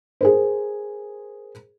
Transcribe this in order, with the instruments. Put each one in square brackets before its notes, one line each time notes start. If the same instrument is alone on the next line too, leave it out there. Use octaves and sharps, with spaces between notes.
[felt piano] G#4 A#4 C5